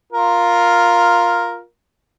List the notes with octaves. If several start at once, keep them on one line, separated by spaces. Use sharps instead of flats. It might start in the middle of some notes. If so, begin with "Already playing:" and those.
F4 A#4